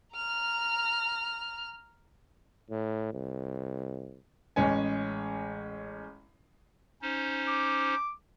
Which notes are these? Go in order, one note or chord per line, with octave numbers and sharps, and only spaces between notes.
A#5 F6
A2
C2
A1 G#3 C#4 G#5
C#4 D#4 C5
D6